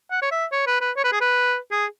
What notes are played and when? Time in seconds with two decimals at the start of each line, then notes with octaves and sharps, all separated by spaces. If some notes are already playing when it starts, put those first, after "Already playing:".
0.11 F#5
0.22 C#5
0.31 E5
0.52 C#5
0.67 B4
0.81 B4
0.96 C#5
1.04 B4
1.12 G#4
1.21 B4
1.71 G#4